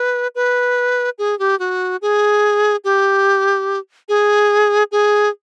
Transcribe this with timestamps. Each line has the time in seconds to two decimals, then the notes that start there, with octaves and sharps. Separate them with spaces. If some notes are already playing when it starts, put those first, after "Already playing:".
Already playing: B4
0.35 B4
1.18 G#4
1.39 G4
1.59 F#4
2.02 G#4
2.84 G4
4.09 G#4
4.92 G#4